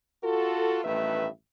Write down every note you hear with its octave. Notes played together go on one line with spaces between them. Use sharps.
F4 F#4 A4
A1 G2 D#3 A3 B4 E5